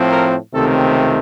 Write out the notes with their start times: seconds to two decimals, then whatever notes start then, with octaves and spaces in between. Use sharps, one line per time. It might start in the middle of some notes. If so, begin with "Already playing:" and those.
Already playing: A2 F3 C4
0.11 A#4
0.53 C#2 C3 D#3 A3 C4 A4